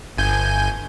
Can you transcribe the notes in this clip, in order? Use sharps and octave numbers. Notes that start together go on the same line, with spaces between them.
G1 G#5 G6